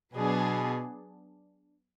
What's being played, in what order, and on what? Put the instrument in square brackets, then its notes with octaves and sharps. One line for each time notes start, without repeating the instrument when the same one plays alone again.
[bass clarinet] B2 [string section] F#3 B3 D4 G#4